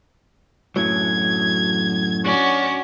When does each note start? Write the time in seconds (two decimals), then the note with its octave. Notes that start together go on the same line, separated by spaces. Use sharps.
0.76 F#2 A2 F#3 G#6
2.22 C#4 D4 F#4